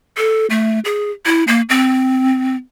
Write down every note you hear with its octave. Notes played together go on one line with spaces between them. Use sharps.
A4
A3
G#4
E4
A#3
C4